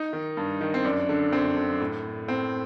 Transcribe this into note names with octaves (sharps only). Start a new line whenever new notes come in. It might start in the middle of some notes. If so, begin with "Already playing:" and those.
Already playing: D#4
D#3
G2
D#3
C4
F#2 D4
D3
F#2 C4
D3
A2
A2 C4